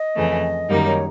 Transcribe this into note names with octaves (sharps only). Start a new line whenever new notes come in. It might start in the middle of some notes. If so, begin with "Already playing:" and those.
Already playing: D#5
F2 C#3 E3 A3
F#2 D#3 G3 A#3 D#4
C#5